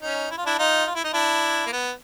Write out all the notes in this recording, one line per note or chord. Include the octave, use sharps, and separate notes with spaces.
C#4 D#4
E4
F4
D4 E4
D#4 F4
F4
E4
D#4
D4 E4
A#3
B3